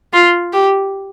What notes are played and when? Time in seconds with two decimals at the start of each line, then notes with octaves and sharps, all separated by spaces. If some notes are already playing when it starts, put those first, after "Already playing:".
0.13 F4
0.53 G4